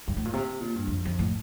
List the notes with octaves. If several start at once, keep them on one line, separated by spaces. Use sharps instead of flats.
G2
A2
A#2
C3
A#2
G2
F2
F2
A2